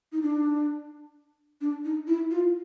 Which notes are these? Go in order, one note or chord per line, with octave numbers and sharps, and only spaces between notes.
D#4
D4
D4
D#4
E4
F4